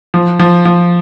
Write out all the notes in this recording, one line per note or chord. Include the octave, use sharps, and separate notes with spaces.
F3
F3
F3